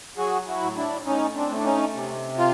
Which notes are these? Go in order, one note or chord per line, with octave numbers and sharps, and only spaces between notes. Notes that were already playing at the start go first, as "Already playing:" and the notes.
F#3 F#4 G#4
E4 F#4
A2
D4 E4
A2 C#4 D#4
C4 D4
A3
D4
C#4 D#4
C3
F4